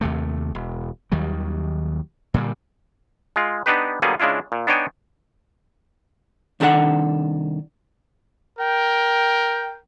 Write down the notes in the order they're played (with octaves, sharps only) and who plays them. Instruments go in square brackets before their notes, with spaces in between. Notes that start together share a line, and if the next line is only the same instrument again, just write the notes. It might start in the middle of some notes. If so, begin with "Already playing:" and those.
[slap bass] D#2 C3 A3
E1
D#2 D#3 F#3 G3
A#2 D3 E3 G3
[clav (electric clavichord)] G#3 F4
B3 D4 D#4 G4 B4
D3 F#3 G3 A#3 B3 G#4
C#3 G#3 D4 E4 F4
A#2
B3 D4 D#4 C#5 G5 G#5
[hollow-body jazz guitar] C2 D#3 D4 A4 A#4 F#5
[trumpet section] A#4 G5